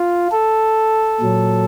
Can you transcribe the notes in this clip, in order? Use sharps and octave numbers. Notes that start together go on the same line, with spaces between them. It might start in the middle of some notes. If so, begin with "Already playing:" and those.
Already playing: F4
A4
A#2 F#3